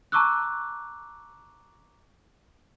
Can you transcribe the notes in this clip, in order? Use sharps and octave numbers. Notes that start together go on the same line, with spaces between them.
A5 A#5 C#6 D6 E6 F#6